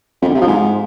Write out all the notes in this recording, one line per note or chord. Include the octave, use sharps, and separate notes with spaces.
F2
D3
C3
F3
G#2